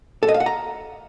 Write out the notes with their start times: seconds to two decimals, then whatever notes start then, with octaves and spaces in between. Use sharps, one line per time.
0.23 A4
0.28 D#5
0.34 F5
0.40 F#5
0.46 A#5